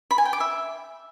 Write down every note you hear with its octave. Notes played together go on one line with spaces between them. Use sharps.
B5
G#5
G5
D6
E5